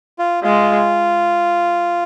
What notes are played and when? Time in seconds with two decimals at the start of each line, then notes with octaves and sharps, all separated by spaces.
0.19 F4
0.44 G#3 F4